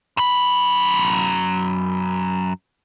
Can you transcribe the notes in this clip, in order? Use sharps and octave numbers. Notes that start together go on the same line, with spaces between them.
F#2 B5